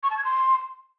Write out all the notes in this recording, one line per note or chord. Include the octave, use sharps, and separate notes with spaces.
C#6
A5
G#6
C6